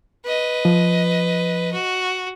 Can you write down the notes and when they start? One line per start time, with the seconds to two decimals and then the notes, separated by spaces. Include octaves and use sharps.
0.25 B4 D#5
0.65 F3
1.73 F#4